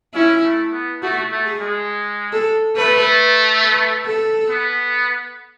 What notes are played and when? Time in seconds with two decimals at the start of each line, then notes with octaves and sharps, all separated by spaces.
0.15 C#4 E4
0.44 A3
0.73 B3
1.02 A3 F#4
1.32 A3
1.46 G#4
1.60 G#3
2.33 A4
2.76 A3 B4
3.62 B4
4.06 A4
4.50 B3